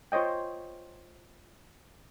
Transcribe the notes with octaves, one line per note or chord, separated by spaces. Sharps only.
F4 C5 C#5 D#5 G5